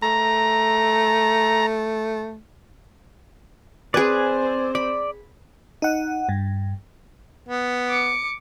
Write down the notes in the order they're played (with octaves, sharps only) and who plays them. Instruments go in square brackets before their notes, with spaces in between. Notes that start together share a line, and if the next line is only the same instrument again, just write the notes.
[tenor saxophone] A3 [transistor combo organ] A#5
[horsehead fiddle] C4 C5 [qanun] G#4 B4 [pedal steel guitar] D5 G#5
[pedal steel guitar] D5 [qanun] B5
[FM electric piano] D#4 F#5
G2
[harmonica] B3
[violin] D6 C#7